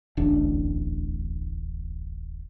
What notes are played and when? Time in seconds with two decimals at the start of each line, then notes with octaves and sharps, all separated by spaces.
0.17 D1 A1 E2 D4